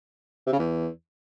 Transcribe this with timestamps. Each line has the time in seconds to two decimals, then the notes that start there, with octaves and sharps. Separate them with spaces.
0.46 C3
0.53 C#3
0.59 E2